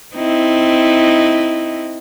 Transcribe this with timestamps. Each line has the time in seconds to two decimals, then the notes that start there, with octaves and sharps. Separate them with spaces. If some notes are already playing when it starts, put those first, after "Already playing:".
0.15 C4 D#4 E4